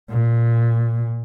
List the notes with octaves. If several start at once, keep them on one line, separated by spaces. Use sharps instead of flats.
A#2